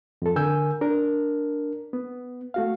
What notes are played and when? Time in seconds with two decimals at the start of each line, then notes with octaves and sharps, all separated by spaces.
0.22 F2 A4
0.36 D3 A#4 G#5 E6 G6
0.81 D4 A#4
1.93 B3
2.54 A3 F#4 F5